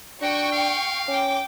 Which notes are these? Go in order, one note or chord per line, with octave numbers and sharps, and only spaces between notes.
D4 F#4 G5 C#6
F5
C#4 G5 D6